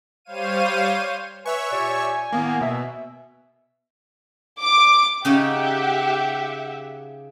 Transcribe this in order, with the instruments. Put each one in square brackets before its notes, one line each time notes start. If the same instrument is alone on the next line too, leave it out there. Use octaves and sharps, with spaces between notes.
[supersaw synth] G3 C5 C#5 F5 D#7
[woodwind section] B4 [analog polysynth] C#5 E5 C#6 [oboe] G#5
[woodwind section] A#2 G4 D5
[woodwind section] A2 D#3 B3 [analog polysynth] A#3
[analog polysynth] B2 [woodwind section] E5
[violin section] D6
[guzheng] C#3 C#4 D#4 [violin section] G4 E5 F#5